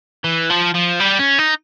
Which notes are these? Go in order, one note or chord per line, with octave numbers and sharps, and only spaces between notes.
E3
F3
F3
G3
C#4
D#4